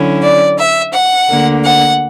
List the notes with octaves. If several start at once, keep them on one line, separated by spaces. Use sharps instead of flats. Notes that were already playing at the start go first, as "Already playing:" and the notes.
Already playing: D3 F#3 C#4 E4
D5
E5
F#5
D2 D3 A#3
F#5